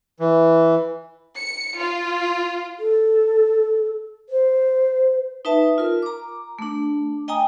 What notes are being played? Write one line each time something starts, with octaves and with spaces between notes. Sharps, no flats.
E3
C#7
F4
A4
C5
D#4 B4 E5 A5
F4 A#4
A#5 D6
A3 D4
D#5 G5 G#5 A#5 D#6